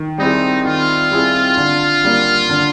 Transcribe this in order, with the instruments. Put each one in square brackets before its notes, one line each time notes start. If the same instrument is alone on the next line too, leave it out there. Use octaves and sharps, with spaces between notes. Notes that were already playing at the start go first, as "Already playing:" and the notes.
Already playing: [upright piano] D#3
[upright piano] G3 C4 E4 G#4 [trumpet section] D#4
[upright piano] D#3 [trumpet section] F4
[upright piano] G3 C4 E4 G#4
D3
G3 A#3
D3